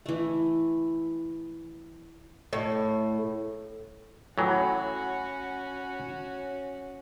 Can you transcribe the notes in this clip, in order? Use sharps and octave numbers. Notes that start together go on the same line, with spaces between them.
E3 A3
A2
A2 E3 F#3 C#4 F#4 F#5 G#5 B5